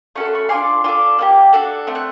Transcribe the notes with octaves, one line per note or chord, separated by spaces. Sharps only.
A3 C#4 F#4 A4 C#6
C6
B5 C#6
D4 F4 G#4 C6 D6
D4 F4 A4 C6 D6
A#3 D4 G4
D4 F#4 A4
A3 C4
F#6